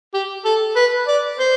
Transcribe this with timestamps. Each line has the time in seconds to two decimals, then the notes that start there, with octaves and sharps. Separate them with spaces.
0.14 G4
0.45 A4
0.76 B4
1.08 D5
1.39 C5